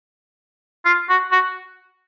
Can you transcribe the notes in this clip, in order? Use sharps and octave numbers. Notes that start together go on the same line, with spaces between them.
F4
F#4
F#4